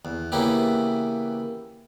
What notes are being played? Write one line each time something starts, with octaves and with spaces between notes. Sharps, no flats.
E2
C#3 E3 A#3 B3 E4 G4